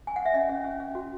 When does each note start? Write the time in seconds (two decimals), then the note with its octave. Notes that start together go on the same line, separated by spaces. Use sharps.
0.07 G#5
0.16 F#5
0.25 E5
0.34 C#4 D#5
0.49 C#4
0.65 C#4
0.80 C#4
0.95 F#4